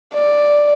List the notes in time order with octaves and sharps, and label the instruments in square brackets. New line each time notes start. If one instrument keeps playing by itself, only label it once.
[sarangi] D5